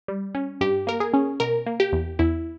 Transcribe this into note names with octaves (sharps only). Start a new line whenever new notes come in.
G3
C#4
G2 G4
A#3 A#4
G#4
C#4
B2 A#4
A#3
G4
E2
E2 E4